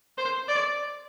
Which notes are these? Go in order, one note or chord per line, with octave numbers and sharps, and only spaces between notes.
C5
D5